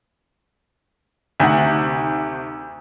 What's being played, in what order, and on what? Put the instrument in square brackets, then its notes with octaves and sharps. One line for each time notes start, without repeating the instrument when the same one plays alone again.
[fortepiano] D2 [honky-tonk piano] C3 D#3 F#5